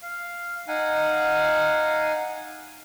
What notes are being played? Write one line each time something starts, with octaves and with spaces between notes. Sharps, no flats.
F5
D#4 F5 F#5 G#5